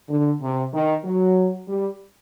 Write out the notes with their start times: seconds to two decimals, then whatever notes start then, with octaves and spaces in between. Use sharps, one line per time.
0.09 D3
0.42 C3
0.73 D#3
1.05 F#3
1.68 G3